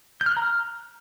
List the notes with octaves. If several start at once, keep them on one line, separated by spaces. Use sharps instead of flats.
G6
F6
F#6
A#5
F6